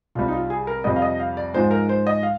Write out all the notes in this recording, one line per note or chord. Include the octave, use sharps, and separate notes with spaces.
C2 C3 G3 F4
D#4
F4
G#4
A#4
F2 C3 G3 D#5
F5
D#5
F5
D5
G#2 F3 G#3 C5
A#4
C5
D#5
F5